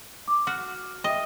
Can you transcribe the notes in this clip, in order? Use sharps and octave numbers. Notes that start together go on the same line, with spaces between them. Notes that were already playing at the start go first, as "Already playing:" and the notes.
D6
F#4 F6
D#5 E5 G5